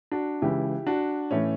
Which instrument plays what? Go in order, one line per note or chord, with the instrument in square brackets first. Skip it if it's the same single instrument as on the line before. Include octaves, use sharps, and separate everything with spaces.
[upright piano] D4 F#4
C#2 C#3 E3 E4 G4
D4 F#4
A2 E3 A3 C#4